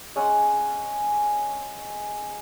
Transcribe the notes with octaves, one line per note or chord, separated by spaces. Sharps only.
G#3 C#4 F#5